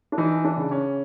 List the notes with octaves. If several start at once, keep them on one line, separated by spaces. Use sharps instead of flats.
D4
E3 D#4
D4
C#3
C#4